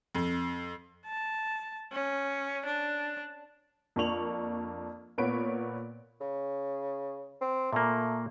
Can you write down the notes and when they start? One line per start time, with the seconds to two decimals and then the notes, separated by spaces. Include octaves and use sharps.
0.15 F2
1.06 A5
1.93 C#4
2.66 D4
3.96 F2 A#3 D4 C#6 F7 F#7
5.18 A#2 B3 B4 C#5 D7
6.21 C#3
7.41 C4
7.73 A#2 A3 A#3